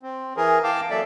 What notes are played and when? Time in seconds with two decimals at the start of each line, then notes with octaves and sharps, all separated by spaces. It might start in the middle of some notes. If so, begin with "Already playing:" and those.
0.03 C4
0.37 E3 G#4 A#4
0.64 F5 G5 A5 D6
0.90 F#3 A#3 A4 D5 E5